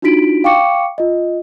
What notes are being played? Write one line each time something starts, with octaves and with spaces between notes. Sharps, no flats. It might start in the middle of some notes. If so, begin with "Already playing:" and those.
D4 D#4 F4 F#4 B6 D7
F5 G5 C#6 D6 C#7
F4 D#5